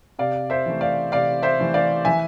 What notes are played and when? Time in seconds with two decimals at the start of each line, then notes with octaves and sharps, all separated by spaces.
0.19 C3 D5 F5
0.50 C5 E5
0.66 E3 A3
0.81 D5 F5
1.12 C3 D5 F5
1.43 C5 E5
1.59 E3 A3
1.74 D5 F5
2.05 E3 E5 G#5